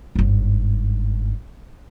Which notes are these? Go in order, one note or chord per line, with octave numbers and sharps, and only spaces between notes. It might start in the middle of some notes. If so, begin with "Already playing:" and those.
G1 G#2